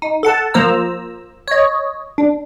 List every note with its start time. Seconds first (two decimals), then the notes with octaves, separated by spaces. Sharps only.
0.02 D#4
0.23 A4 F#5 A5
0.54 F3 A#3 C5 A#5 E6
1.48 C#5 D#5
2.18 D4